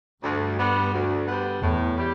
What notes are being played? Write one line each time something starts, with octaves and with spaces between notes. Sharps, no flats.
D2 G2
D3 G3 B3
D2
D3 G3 B3
E2 A2
G3 E4 G4